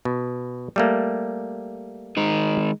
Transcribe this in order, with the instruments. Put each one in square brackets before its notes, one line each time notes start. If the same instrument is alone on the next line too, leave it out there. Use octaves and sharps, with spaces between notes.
[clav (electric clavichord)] B2
G3 A3 A#3
[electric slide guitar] D#3 G#3 D#4